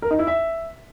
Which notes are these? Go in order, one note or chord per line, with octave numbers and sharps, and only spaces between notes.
A#4
D#4
E4
E5